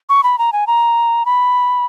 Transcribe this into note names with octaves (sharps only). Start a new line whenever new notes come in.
C#6
B5
A#5
G#5
A#5
B5